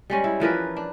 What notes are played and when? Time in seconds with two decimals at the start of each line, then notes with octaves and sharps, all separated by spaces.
0.10 G3 G#3 C#4
0.24 E4
0.40 E3 F3 A#4 B4
0.77 D4